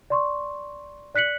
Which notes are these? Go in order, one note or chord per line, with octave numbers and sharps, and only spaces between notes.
D5 C6 C#6
D5 F#6 B6 C#7 F#7